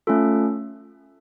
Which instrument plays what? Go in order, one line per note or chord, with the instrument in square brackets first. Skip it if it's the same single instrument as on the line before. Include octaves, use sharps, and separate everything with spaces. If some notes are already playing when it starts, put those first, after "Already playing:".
[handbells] A3 C#4 F4 A4